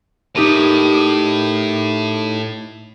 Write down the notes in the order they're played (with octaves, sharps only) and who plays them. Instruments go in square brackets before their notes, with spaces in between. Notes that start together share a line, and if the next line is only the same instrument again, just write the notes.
[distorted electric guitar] A2 [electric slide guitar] D#4 G4 A#4